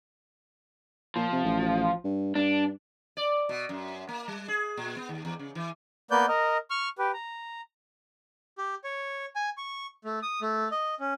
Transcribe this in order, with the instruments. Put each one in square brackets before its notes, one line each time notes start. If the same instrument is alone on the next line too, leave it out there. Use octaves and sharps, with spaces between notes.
[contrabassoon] A#2 [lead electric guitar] F3
[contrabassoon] C3
A1
G2
[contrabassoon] G2 [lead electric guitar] D4
[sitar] D5
B2
F#2
A#3
G3
G#4
A#2
B3
D#2
E2
C#3
E3
[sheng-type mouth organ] A#3 B3 B4 D5 G6
A#4 D#5
C#6 F6
G4 B4
A#5
G4
C#5
G#5
C#6
A3
D#6
A3
D#5
C#4